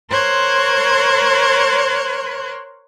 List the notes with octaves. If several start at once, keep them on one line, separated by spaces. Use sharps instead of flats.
A#4 C5 C#5 C6 F#6 G#6